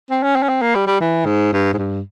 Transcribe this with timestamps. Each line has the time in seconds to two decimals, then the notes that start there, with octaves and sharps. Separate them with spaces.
0.11 C4
0.23 C#4
0.36 C4
0.42 C#4
0.49 C4
0.62 A#3
0.75 G3
0.87 G3
1.01 E3
1.26 G#2
1.53 G2
1.74 G#2
1.78 G2